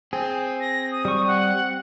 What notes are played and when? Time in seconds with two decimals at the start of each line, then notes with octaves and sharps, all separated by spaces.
0.13 C4 G#4
0.60 A#6
0.91 D#6
1.05 G3 C#6
1.28 F#5